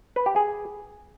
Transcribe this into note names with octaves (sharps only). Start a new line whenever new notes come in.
B4
G4
G#4